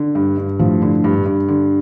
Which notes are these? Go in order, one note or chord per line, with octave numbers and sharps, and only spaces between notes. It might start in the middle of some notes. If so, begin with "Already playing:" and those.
Already playing: D3
G2
G2
A2 F3
D3
G2
G2
D3